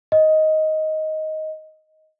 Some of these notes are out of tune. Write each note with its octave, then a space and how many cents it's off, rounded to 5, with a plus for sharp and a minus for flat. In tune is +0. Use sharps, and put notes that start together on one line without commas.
D#5 +10